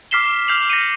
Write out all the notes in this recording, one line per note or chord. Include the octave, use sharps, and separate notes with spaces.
D6 F6 B6 C7 E7 G7
F6 G6 C7 F7 F#7
A#6 C#7 D#7